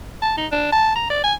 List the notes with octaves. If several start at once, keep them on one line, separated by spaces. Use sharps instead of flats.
A5
D#4
D4
A5
A#5
D5
G#5